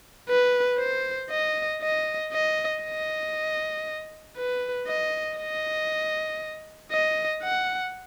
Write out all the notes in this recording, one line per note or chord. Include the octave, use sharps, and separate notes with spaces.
B4
C5
D#5
D#5
D#5
D#5
B4
D#5
D#5
D#5
F#5